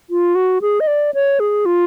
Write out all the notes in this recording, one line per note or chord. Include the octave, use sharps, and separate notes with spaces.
F4
F#4
G#4
D#5
D5
C#5
G#4
F4